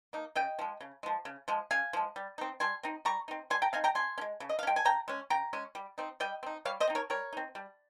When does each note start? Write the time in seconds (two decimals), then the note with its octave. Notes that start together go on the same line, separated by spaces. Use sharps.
0.13 A#3 D#4
0.35 C#3 D#5 G5
0.59 F3 G#3
0.81 C#3
1.03 F3 G#3
1.25 C#3
1.48 F3 G#3
1.71 C#3 F5 G#5
1.93 F3 G#3
2.16 G3
2.38 C4 D#4
2.60 G3 G#5 C6
2.83 C4 D#4
3.05 G3 A#5 C#6
3.28 C4 D#4
3.50 G3 G#5 C6
3.62 G5 A#5
3.73 C4 D#4 F5 G#5
3.84 G5 A#5
3.95 C#3 G#5 C6
4.18 C#4
4.21 G#3
4.40 C#3
4.49 D#5
4.59 F5
4.63 C#4
4.67 G#3 G5
4.76 G#5
4.85 C#3 G5 A#5
5.08 G#3 C#4
5.30 C#3 G5 A#5
5.53 G#3 C#4
5.75 G3
5.98 C4 D#4
6.20 G3 D#5 G5
6.43 C4 D#4
6.65 G3 C#5 F5
6.80 C5 D#5
6.87 C4 D#4
6.95 A#4 C#5
7.10 G3 A#4 C#5
7.33 C4 D#4
7.55 G3